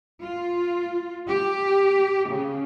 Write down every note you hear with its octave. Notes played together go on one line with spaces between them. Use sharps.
F4
G4
C#3